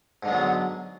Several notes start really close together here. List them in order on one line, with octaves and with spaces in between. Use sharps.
G#2 D3 G#3 B3 F#3